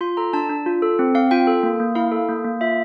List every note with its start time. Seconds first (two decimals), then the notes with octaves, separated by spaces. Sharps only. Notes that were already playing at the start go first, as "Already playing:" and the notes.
0.01 F4 C6
0.17 A4 A#5
0.33 D4 A5
0.49 D4
0.66 F4
0.82 A4
0.99 C4
1.14 C4 F5
1.31 F4 G5
1.47 A4
1.63 A#3
1.80 A#3
1.95 E4 F5
2.12 A4
2.29 A#3
2.45 A#3
2.61 F4 E5